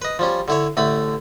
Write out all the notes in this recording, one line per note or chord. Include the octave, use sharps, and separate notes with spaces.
B4 D#5
F3 G3 C#4
D3 E4 C#5
A1 D3 A3 B5